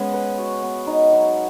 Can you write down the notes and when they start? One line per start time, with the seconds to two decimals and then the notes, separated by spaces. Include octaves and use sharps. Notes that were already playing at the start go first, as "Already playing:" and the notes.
Already playing: G#3 B3 C#4 G#4
0.14 B4
0.38 F#4
0.63 B3
0.87 D#4
1.13 F#3